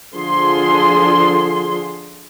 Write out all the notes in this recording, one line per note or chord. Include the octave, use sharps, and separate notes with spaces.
D3 F3 G#4 C6